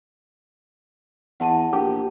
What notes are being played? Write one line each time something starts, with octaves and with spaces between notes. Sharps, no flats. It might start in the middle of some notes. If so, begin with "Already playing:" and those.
E2 F#5 A5 D#7
A#1 G4